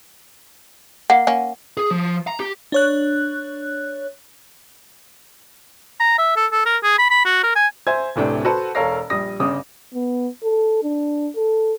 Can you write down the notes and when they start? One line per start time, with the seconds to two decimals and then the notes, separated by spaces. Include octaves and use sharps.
1.10 A#3 F#5
1.27 A#3 C#4
1.77 G#4
1.91 F3
2.27 A#5
2.40 G4
2.72 D4 C#5 F#6
6.00 A#5
6.19 E5
6.36 A4
6.52 A4
6.66 A#4
6.84 G#4
6.99 B5
7.11 B5
7.25 F#4
7.43 A#4
7.56 G#5
7.87 C5 E5 G#5 G#6
8.16 D1 A2 C3 D4
8.45 F#4 A4 B4 C5 F#5 A5
8.75 E1 A4 A#4 C#5 F5 A#6
9.10 A#1 G3 D#6 A#6
9.40 G1 C#3 D6 D#6
9.94 B3
10.44 A4
10.83 D4
11.36 A4